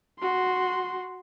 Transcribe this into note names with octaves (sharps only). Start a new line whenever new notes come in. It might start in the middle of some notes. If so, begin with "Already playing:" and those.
F#4 C6